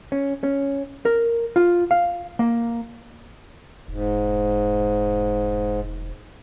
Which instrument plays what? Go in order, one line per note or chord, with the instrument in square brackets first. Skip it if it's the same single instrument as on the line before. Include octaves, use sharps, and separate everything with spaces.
[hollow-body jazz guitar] C#4
C#4
A#4
F4
F5
A#3
[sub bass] E1 [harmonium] G#2